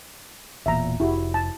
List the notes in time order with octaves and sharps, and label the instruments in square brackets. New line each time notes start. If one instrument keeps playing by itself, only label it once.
[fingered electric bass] E1 E2 A#2 [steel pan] E5 A#5
[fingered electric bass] F1 [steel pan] E4 F#4 G4
[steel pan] A5